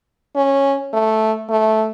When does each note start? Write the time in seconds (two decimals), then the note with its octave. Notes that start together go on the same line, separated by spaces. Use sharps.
0.36 C#4
0.93 A3
1.50 A3